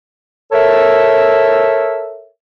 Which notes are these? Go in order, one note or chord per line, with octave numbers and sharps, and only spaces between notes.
A4 A#4 C#5 E5